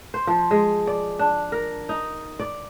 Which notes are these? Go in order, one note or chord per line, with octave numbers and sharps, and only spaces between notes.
C5
F3
G#3
D5
D4
A#4
D#4
D5